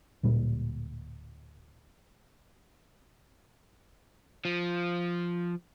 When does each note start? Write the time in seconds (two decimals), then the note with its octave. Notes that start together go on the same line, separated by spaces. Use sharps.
0.23 D1 A#2 G3
4.45 F3